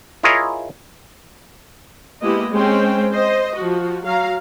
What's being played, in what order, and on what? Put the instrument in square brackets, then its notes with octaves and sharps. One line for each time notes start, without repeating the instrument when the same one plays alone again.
[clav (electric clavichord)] E4 F4 G#4 A#4 C#5 D#5
[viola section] G#3 A#3 B3 E4 G4 D#5
G#3 C4 C#4 C5 G5
C5 D#5
F3 F#4
F#3 F5 A#5